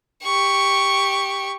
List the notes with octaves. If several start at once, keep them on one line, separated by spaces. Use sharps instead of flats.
G4 C#6